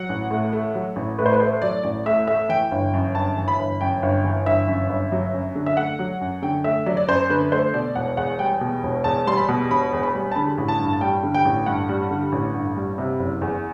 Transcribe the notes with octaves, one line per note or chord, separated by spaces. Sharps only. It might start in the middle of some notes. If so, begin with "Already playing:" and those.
Already playing: F#3 F#5
A1
A2
A3
F#3
A1
A2 B4
C5
B4
A3 C5
F#3 D5
A1 D5
A2 E5
A3 E5
E3 G5
G1
F#2
G1 A5
E3
B5
G1
F#2 G5
G1
E3
G1 E5
F#2
G1
F#3
F#2
D3
E5
A3 F#5
F#3
F#2
D3 G5
A3 E5
F#3 D5
D5
F#2 C5
D3 B4
A3 C5
B2 D5
E1 F#5
E2 F#5
G3 G5
B2
E1
E2 A5
G3 C6
B5
B2
E1 B5
E2
B5
G3
A5
D3 B5
A1
A5
G2
A5
G3 G5
D3
G5
A1
G2 F#5
G3
D3
A1
G2
G3
C3
F#1
E2